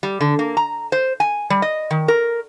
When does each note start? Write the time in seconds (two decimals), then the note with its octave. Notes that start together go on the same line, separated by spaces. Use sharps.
0.03 G3
0.21 D3
0.39 A#3
0.57 A#5
0.92 C5
1.20 G#5
1.50 G3
1.62 D#5
1.91 D#3
2.08 A#4